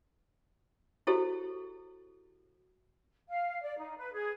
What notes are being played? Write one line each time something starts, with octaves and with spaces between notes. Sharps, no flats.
E4 F#4 G4 A4 C5
F5
D5
D#4
B4
G#4